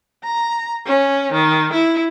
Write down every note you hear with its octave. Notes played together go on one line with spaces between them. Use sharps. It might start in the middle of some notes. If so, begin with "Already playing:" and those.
A#5
C#4
D#3
E4